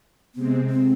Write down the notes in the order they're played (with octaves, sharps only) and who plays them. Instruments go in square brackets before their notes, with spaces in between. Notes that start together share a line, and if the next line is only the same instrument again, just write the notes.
[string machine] C3 G#3 C4 [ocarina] B3
[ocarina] C4